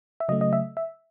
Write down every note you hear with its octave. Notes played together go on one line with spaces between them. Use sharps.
E5
C#3 F#3 A3 D#5
D#5
E5
E5